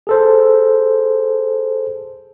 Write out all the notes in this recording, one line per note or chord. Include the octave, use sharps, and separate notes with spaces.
G#4 A4 C5